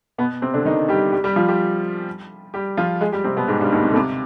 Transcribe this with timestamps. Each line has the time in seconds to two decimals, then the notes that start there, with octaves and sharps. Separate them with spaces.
0.18 B2 B3
0.42 C3 C4
0.54 D3 D4
0.65 D#3 D#4
0.89 G3 G4
1.12 G3 G4
1.24 G3 G4
1.36 F3 F4
1.48 G3 G4
2.54 G3 G4
2.77 F3 F4
3.01 G#3 G#4
3.12 G3 G4
3.24 C3 C4
3.36 B2 B3
3.48 G#2 G#3
3.61 G2 G3
3.72 D#2 D#3
3.83 C3
3.91 D3
3.96 C3